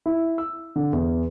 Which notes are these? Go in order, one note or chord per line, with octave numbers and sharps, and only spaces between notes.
E4
E6
D3
E2